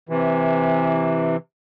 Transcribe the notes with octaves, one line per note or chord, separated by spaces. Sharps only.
C3 E3